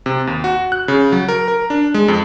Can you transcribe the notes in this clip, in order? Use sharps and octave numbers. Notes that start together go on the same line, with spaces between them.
C3
D#2
F#4
F#6
C#3
F#3
A#4
A#4
D4
G#3
F2